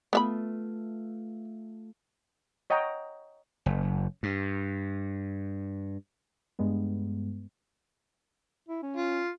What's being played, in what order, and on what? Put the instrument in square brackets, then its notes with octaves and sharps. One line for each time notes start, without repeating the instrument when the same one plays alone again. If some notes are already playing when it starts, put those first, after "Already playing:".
[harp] A3 F4 [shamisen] B3 E5 B5
[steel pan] C#5 D#5 F#5 G5 A#5
[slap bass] F#1
G2
[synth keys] G2 G#3 B3
[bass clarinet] E4
C#4
[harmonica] F4